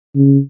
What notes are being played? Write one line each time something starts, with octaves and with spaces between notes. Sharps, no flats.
C#3